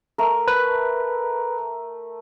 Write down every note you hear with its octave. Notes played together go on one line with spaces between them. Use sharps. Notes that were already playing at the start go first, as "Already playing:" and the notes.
A3 A#4
B4